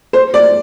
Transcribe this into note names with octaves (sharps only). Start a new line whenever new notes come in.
C5
D5